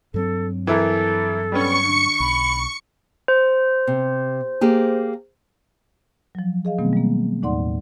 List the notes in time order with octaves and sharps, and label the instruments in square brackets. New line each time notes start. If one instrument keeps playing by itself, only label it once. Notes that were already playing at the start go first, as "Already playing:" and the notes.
[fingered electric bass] G2 F#3 C4 [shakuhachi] A4
[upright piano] E3 E4 A#4 [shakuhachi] A4
[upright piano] G3 B3 C#4 [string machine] C#6 C#7
[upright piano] D3
[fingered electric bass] B1 [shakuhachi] B5
[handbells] C5
[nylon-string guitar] C3
A#3 G4 G#4
[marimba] F3 F#3
G#4 D#5 F5
B2 D#3 F#3 A3 B3 C4
G3 A#3
D#2 A2 D#4 D5 F#5 C6